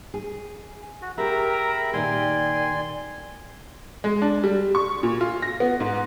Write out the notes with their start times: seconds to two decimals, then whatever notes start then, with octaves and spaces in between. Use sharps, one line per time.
0.14 G#4
1.02 F#4
1.18 G4 G#4 A#4 E5 A#5 B5
1.93 A#2 D#3 G4 D5 G#5 C6
4.04 G#3
4.22 D4
4.44 G3
4.75 C#6
5.03 A#2
5.21 F4
5.42 A#6
5.60 B3
5.80 G#2